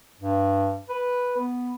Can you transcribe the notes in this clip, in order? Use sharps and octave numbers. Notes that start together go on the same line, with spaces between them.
G2
B4
B3